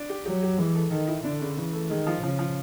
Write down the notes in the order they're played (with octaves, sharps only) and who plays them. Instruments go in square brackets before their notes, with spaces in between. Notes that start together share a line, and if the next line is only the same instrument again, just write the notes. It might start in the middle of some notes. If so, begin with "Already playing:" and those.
Already playing: [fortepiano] D4
G4
[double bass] F#3 [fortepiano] G4
[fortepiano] G4
[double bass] E3 [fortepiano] G#3
[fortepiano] A4
[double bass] D#3 [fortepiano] A4
[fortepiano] E4
[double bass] D3 [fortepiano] D4
[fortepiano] C#3
[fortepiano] C#3 [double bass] E3
[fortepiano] A3
[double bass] D#3 [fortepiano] G#3
[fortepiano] F3
[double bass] C#3 [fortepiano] F3
[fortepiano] F3